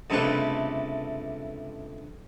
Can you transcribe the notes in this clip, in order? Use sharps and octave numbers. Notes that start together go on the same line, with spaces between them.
C#2 G2 C3 A3 B4